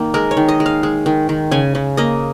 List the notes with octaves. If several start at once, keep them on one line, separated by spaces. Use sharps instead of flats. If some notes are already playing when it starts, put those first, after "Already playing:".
Already playing: D#3 A#3
G#3 A#4
C#5
D#3
D#5
G#3
F5
G#3
D#3
D#3
C#3 G#5
C#3
A#3 D#5